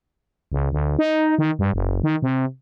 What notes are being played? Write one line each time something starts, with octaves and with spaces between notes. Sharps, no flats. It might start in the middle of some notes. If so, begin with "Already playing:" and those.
C#2
D2
D#4
D#3
G2
F#1
D#3
C3